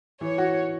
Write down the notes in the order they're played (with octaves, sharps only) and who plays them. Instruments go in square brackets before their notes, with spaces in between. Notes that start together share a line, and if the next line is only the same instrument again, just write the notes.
[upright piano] E3 [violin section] C#5
[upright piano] F#4